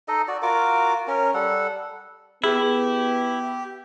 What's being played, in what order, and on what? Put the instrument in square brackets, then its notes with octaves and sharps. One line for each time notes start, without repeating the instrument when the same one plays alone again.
[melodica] D#4 A4 D#5
F#4 D5
F4 F#4 A#4 D6
C#4 A#4
G3 A4 F#5
[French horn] B3 [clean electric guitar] E4 [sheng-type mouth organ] G4 [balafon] G#4